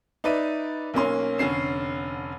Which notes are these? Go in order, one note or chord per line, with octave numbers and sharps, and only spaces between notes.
D#4 B4 D5 E5 D#7
B1 A#3 C#4 C6
F1 D3 C#4 C7 E7